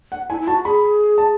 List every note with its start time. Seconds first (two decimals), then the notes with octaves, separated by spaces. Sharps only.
0.12 F#5
0.30 E4 G#5
0.41 E4
0.47 F#4 A5
0.65 G#4 B5
1.18 A5